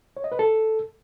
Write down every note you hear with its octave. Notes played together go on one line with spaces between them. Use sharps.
C#5
D#5
B4
A4